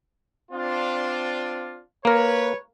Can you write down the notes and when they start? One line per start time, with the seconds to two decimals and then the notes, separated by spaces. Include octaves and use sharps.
0.51 C4 D4 F4
2.05 A#3 A#4 B4 C#5